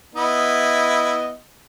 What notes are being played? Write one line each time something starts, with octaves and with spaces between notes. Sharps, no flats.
B3 E4 D#5